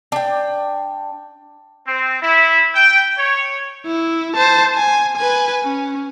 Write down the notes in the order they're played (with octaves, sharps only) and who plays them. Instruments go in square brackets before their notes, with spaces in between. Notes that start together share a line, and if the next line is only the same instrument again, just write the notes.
[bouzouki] D4 G5
[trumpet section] C4
E4
G5
C#5
[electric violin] E4
C5 A5
G#5
B4 G#5
C#4